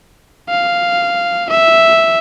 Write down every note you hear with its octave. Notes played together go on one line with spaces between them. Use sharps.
F5
E5